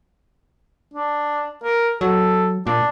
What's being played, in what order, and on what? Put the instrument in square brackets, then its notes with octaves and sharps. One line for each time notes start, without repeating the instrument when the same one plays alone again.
[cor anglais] D4
A#4
[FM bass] F#3 [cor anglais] A4
[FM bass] A#2 [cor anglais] D4